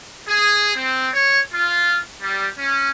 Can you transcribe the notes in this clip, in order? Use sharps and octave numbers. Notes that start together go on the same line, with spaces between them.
G#4
C4
C#5
F4
G3
C#4